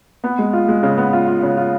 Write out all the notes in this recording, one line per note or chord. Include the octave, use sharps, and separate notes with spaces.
B3
G#3
F4
G#3
C#3
B3
F4
F4
C#3
F4